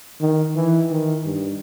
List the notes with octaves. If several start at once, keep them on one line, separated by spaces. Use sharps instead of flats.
D#3
E3
D#3
G2